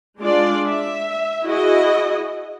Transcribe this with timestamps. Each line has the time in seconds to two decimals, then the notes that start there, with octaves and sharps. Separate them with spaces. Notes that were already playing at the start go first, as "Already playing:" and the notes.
0.19 G#3 D4 F4 D5
0.67 E5
1.45 E4 F#4 G#4 D#5